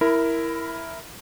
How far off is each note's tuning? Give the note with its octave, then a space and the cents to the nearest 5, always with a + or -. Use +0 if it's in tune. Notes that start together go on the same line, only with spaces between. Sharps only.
E4 +0 A#4 +0 B5 +30